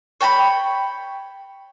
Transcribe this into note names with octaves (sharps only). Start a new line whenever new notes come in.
C#5 G5 A5 B5